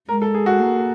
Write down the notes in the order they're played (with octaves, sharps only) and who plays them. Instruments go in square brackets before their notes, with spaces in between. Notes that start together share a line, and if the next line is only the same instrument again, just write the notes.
[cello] G#3 [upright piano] A#4
[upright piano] A4
G#4
F#4
[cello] A#3